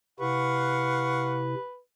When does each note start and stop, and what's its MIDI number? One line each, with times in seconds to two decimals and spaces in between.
0.20 1.55 48
0.20 1.55 64
0.20 1.79 71
0.20 1.43 77
0.20 1.43 78
0.20 1.43 85